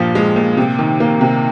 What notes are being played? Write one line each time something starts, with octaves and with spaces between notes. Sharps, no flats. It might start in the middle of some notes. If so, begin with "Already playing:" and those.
Already playing: G2 A#2 F3
G#3
A#2
C3
D#3
A#3
C3